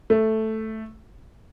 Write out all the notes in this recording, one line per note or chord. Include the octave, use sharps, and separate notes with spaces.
A3